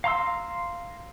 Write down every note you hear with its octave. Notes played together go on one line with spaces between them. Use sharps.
F5 A#5 C6 E6